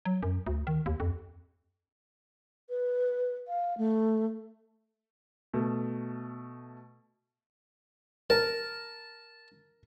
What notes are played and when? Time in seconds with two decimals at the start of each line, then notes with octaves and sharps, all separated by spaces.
0.05 F#3
0.23 F#2
0.47 D2
0.67 D#3
0.86 D#2
1.00 F2
2.70 B4
3.48 F5
3.78 A3
5.53 B2 A3
8.30 A#4 A5